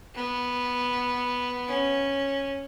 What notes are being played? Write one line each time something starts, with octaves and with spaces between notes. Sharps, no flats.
B3
C#4